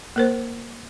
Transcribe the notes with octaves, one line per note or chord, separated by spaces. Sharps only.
A#3 A#4 C5